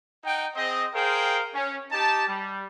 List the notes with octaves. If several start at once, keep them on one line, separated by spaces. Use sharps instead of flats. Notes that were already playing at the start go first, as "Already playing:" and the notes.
D#4 F#5 G5
C4 G#4 C5 D#5
G#4 A#4 C5 F5 G5
C#4
D#4 G4 A5
G3